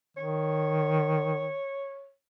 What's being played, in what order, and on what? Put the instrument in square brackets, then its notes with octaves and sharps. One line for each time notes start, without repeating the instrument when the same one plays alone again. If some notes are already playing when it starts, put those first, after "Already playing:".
[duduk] D#3 [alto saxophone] C#5